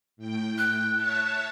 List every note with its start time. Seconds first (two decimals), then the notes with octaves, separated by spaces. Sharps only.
0.17 A2 G5
0.58 F#6
0.95 C#5 E5 A5